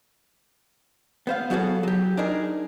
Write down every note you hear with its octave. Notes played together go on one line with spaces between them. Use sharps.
B3 C5 F5
F#3 B3 F#4 G#4 A4
F#3 G4
D4 D#4 G#4 A#4